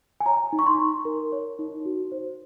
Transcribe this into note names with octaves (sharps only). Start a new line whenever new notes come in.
G#5
C#5 A#5
D#4
C#6
C6
D#4
A#4
C#5
D#4
F#4
C5